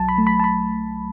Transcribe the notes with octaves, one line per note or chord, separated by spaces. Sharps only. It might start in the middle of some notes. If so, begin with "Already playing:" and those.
Already playing: B1 F#3 A5
B5
A3
B5
A5
B5